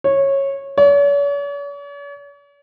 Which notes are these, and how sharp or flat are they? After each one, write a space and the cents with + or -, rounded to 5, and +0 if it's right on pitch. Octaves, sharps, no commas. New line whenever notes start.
C#5 -15
C#5 +45